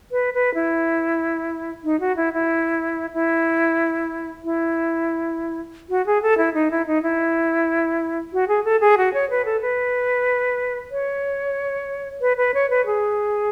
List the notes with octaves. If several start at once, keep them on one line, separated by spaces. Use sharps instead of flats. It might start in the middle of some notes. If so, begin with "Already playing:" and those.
B4
B4
E4
D#4
F#4
E4
E4
E4
E4
F#4
G#4
A4
E4
D#4
E4
D#4
E4
F#4
G#4
A4
G#4
F#4
C#5
B4
A4
B4
C#5
B4
B4
C#5
B4
G#4